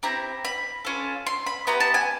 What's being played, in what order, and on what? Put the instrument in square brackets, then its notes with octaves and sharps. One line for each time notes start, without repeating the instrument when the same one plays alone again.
[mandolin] C4 E4 G4 A#5
B5
C#4 F4 A4
C6
B5
B3 E4 G4 A#5
A5
G#5